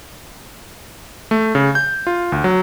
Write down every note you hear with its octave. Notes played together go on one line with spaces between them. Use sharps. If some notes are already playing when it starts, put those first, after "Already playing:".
A3
C#3
G6
F4
D2
F#3